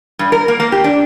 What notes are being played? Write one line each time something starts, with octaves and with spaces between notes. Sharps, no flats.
G2
A#4
A#3
A#3
G4
D4